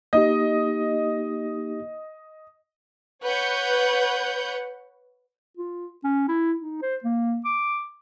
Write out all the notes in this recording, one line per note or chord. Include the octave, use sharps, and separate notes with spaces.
A#3 D#4 G4 D#5
B4 C#5 F#5 G6
F4
C#4
E4
D#4
C5
A#3
D6